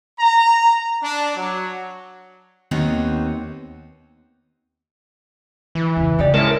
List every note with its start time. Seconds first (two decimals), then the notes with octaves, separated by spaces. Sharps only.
0.19 A#5
1.03 D4
1.36 F#3
2.71 D#2 B3 C4 D#4 B4 C#5
5.75 E3
5.96 E2 C#3
6.19 C#3 A3 D#4 G4 D5
6.34 G#3 C#4 E4 A#4 A5